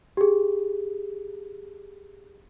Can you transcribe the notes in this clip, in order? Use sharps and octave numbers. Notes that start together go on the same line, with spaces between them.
G4 G#4